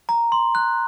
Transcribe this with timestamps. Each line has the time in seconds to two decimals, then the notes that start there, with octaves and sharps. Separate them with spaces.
0.09 A#5
0.32 C6
0.55 F#6